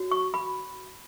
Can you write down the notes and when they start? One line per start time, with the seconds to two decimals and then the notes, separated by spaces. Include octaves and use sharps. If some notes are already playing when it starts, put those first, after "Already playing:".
Already playing: F#4 C#5
0.11 C#6
0.34 B5